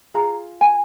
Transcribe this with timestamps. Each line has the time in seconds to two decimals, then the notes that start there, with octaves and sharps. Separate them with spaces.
0.14 F4 G#4 A#5
0.61 G#5